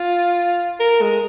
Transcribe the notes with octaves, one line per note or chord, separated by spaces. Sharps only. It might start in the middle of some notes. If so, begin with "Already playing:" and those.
Already playing: F4
A#4
G#3